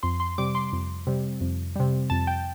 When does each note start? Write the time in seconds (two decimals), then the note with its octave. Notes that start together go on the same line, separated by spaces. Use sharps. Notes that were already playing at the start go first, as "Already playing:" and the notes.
0.03 F2 C6
0.20 C6
0.38 C3 G3 D6
0.55 C6
0.73 F2
1.07 C3 G3
1.41 F2
1.76 C3 G3
2.10 F2 A5
2.27 G5